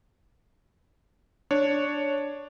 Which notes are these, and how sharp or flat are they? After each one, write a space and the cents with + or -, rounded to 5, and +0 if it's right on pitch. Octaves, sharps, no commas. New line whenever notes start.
D4 +0 C#5 +0